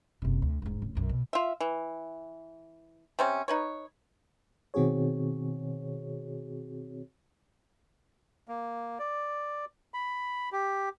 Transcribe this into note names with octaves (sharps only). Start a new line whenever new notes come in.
F#1 C3
D2
E1 G#2
D1 C#3
B1 F#2
B2
F4 E5
E3
C3 C4 C#4
D#4 B4 C#5
B2 D#3 C4 F#4 G#4 C#5
A#3
D5
B5
G4